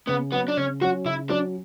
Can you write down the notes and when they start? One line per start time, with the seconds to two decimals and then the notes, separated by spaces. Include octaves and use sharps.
0.07 C#3 B3
0.32 F#3 B3
0.35 C#4
0.48 D4
0.57 C#3 C#4
0.81 F#3 F#4
0.85 C#4
1.05 C#3 E4
1.30 F#3 C#4 D4